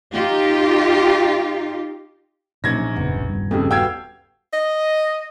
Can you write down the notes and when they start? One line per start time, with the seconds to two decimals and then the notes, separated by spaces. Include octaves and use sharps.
0.13 D#4 F4 G4
2.64 A#1 B2 F#3 C#4 D#4 G#6 A#6
2.96 F#1 F2 C#3 B3
3.14 F#1 B1
3.29 D#1 G2
3.51 F2 C#3 G4 A4
3.71 B3 F#4 F5 G5 E6 G#6
4.53 D#5